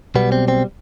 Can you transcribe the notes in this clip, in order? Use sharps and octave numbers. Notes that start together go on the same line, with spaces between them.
B1 B2 G3 B3
C4
C4